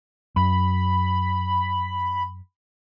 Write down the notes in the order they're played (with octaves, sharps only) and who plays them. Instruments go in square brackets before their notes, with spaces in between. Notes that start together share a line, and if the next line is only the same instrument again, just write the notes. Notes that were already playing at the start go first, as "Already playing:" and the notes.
[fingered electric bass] F#2 [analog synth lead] B5